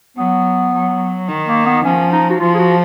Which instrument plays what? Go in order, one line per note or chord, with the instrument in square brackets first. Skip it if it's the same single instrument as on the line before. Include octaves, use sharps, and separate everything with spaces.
[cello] F#3 [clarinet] B3
[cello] F#3
D#3
[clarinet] A#3
B3
[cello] F3 [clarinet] C#4
[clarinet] D#4
F#4
[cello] F3 [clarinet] F4
[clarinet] G#4
F#4